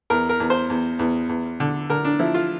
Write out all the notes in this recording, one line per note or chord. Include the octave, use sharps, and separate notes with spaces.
E2 A#4
A#4
E2
C5
E2
E2
E2
D3
D3 A#4
D4
F3 E4
F4